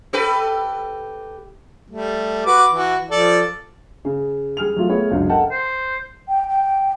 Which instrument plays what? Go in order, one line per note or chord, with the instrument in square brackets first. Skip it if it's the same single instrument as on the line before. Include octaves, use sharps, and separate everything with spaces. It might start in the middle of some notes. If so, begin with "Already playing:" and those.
[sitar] G4 A4 B4
[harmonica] G3 A3
F#4 B4 D6
E3 F#4
F3 A4 D5
[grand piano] C#3
G3 G#4 F6 F7
F#3 A3 F4
A3 B3 G#4 C#5
G1 C#2 F#3 D4
A4 A#4 D#5 F#5 G5 A5
[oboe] C5
[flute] G5
G5